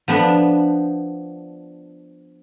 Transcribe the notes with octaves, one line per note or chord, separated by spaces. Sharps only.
F3 B3 D4